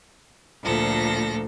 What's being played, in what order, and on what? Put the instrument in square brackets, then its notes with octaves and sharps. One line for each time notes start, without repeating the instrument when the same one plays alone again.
[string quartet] D2 A#2 F3 A3 A4 A#6